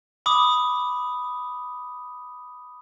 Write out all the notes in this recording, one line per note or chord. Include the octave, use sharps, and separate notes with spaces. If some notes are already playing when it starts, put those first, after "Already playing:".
B5 D6 D#6